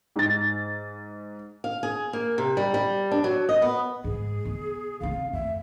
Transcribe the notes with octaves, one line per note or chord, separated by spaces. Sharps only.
G#2 A6
F5
G#4
A#3
C3
G3
G3
D4
F#3
D#5
B3
G#2 G#4
B2
C3 C4 F5
F2 A3 E5